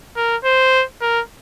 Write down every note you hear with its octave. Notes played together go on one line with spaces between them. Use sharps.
A#4
C5
A#4